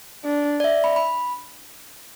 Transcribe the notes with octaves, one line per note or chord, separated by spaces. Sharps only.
D4
D5
E5
B5
B5